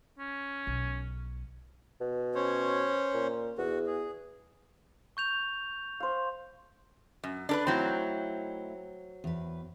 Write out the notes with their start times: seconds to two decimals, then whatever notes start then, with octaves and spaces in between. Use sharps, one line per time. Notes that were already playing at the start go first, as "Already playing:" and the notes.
0.19 C#4
0.67 B1
2.01 B2
2.35 C#4 C5 C#5
3.14 A#2
3.58 E2 F#4
3.86 G#4
5.17 C#6 G6 F7
6.00 C5 F5
7.24 F#2
7.49 D4 A#4 B4
7.67 F#3 A3 C4 D#4 E4
9.24 E2 B4